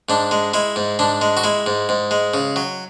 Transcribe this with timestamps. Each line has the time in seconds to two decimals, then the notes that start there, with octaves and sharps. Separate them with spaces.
0.09 G#2 D4
0.31 G#3
0.54 G#3 E4
0.76 G#2
0.99 G#2 D4
1.22 G#3
1.37 F#4
1.44 G#3 E4
1.66 G#2
1.89 G#2
2.11 G#3
2.34 C#3
2.56 F#3